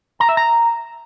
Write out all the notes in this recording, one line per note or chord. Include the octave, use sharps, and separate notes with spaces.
A#5
E5
A#5